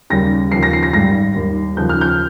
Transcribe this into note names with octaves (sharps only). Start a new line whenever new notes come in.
D#2 C#3 G3 A#6
D#2 C#3 F3 C7
A#6
C7
A#6
G#1 G#2 G3 A#6
D#2 D#3 G3
D#2 C#3 F3 G6
F6
G6